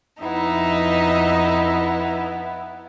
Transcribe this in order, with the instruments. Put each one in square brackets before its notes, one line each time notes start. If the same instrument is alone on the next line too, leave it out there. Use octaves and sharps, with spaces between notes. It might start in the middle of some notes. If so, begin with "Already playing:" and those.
[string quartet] F2 D#4 E5 [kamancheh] B3 E4